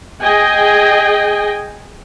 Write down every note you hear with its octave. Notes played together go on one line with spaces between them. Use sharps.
G#4 D#5 G5 G#5